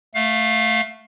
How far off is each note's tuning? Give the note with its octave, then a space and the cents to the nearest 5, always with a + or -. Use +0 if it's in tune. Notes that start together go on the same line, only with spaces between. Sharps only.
A3 +0 F5 +20